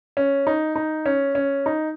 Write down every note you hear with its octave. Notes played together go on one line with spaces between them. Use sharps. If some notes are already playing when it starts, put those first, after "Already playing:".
C#4
D#4
D#4
C#4
C#4
D#4